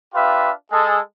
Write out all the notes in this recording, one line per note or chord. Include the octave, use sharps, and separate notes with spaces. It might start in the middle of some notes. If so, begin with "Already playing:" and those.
D4 F4 G4 B4 E5 F5
G#3 G#4 A4